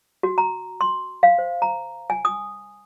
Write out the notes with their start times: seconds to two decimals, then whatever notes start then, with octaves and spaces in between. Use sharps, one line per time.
0.23 F#4
0.38 A#5
0.81 C6
1.23 F5
1.38 C5
1.62 A#5
2.10 G#5
2.25 D#6